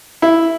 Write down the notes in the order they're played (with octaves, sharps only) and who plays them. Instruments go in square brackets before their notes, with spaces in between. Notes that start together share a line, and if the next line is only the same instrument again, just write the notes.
[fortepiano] E4